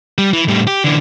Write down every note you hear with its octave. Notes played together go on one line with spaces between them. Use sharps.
G3
E3
A2 G3
G4
D3 E3